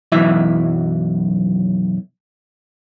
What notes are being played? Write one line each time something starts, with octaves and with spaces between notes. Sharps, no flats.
B1 F#2 E3 E4 E5